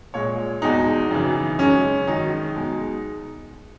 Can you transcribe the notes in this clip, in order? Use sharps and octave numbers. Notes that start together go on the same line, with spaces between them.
A#2 G#3 C#5
E2 B2 G#3 D#4
F#2 C#3 E3
F#2 C#3 G#3 C#4
F#2 D#3 G#3 D#4
B2 G#3